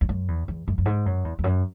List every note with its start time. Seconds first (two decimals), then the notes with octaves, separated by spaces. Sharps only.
0.01 E2
0.09 F#2
0.28 E2
0.48 E2
0.68 F#2
0.78 F#2
0.86 G#2
1.06 F#2
1.24 E2
1.39 E2
1.44 F#2